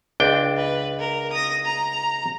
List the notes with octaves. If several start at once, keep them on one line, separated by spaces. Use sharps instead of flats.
C#2 D4 G5
B4
A#4
D#6 A#6
A#5